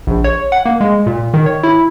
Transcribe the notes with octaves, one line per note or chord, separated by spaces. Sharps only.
A#1
C#5
F#5
A#3
G#3
A#2
D#3
C#5
E4